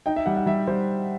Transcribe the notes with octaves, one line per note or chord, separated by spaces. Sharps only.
D#4 G5
E5
G3 F#5
F#5
G3 E5
G3 C5